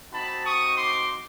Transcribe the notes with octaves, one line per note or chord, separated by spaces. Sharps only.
C4 D#4 F#4 A5 B5
C#6 D#6
C6 D6